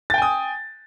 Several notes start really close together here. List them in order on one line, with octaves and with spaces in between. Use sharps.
A6 G5 G#5 D#6